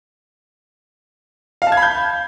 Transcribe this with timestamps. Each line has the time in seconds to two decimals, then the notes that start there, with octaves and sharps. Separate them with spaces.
1.62 F5
1.67 A5
1.72 G#6
1.77 B5
1.82 G6